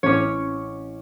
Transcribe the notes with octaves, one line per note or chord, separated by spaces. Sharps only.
A1 C#4 C#5 D6